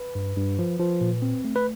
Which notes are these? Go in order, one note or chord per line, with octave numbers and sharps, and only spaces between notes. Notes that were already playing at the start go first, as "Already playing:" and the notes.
Already playing: B4
G2
G2
F3
F3
A#2
C4
A3
B4